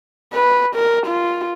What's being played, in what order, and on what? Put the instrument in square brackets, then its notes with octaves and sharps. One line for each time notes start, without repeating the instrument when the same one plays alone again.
[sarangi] B4
A#4
F4